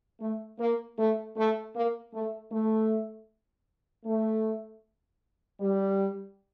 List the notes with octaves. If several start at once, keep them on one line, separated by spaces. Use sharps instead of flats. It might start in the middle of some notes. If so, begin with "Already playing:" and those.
A3
A#3
A3
A3
A#3
A3
A3
A3
G3